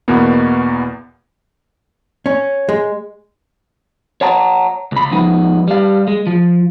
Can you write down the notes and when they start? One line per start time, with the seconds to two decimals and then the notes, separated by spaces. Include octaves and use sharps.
0.08 E2 B2 E3 A#3 B3
2.26 C#4
2.69 G#3
4.21 C#5 F#5 A5 A#5
4.92 C#2 B5
5.12 F3 G#3 B3 D#4
5.68 G3 F5
6.08 G#3
6.27 F3